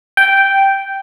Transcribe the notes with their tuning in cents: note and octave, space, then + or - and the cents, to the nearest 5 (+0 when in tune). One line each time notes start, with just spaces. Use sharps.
G5 -5